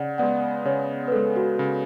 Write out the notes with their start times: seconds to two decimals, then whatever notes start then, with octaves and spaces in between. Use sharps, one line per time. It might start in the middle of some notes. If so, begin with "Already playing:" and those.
Already playing: C#3 D5 F#5
0.18 G#3 B3 D5 F#5
0.65 C#3 C#5
1.08 B4
1.12 G#3 B3 A4
1.36 F#4
1.59 C#3